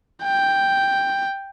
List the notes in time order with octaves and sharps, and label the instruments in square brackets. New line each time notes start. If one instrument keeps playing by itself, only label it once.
[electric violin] G5